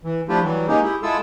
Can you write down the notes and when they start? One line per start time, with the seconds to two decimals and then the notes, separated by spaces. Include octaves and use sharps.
0.04 E3
0.29 F3 A3 D4 E4 F4 G4
0.42 E3 F#3 G3
0.68 G#3 A#3 C#4 D#4 G4 G#4
0.83 E4 G4 G#4
1.03 G#3 E4 F4 G#4 A4 E6